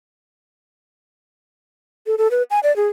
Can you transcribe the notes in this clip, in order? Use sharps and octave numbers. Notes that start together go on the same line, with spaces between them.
A4
A4
B4
G#5
D5
G#4